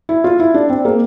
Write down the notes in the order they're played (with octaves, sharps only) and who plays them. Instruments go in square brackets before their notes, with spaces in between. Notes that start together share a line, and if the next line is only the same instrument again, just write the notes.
[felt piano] E4
F4
E4
D4
C4
A#3